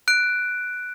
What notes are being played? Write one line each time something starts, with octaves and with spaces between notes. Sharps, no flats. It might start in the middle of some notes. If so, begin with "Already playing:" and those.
F#6 D7